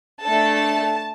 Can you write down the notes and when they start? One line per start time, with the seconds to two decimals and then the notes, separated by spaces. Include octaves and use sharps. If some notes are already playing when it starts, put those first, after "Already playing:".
0.23 A3 D4 A4 A5